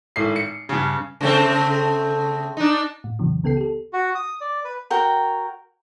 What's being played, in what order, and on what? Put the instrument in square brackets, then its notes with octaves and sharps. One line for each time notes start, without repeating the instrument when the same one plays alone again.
[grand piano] G#1 A2 C7
C#7
G2 C#3
[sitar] C#3 A3 C4
D4 D#4
[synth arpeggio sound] A2
F2 A#2 C#3 E3 F#3
C#2 C#3 B3 A4 G5 C7
G4 A4
[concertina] F#4
D#6
D5
B4
[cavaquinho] F#4 A#4 C#5 G5